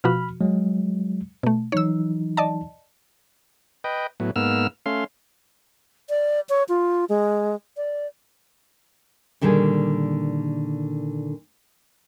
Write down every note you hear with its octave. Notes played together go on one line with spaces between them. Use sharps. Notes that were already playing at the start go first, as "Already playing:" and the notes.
B2 F3 F#4 B5 F6
F#3 G#3
B2 A3
E3 F#3 D#4 C#5 E6
D5 D#5 A5
B4 D#5 G5
A2 F#3 B3
G#2 A#3 B3 E6 F6
A3 C#4 F5 C6
D5
C#5
F4
G#3
D5
A#2 D3 D#3 G3 G#4